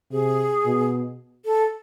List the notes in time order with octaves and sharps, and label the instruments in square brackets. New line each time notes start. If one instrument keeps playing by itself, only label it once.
[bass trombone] C3 [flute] G#4
[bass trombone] B2
[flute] A4